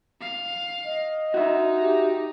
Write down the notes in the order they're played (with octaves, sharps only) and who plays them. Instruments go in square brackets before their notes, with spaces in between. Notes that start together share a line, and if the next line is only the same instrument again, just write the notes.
[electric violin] F5
[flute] D#5
[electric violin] D#4 [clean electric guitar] F#4 E5
[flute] G4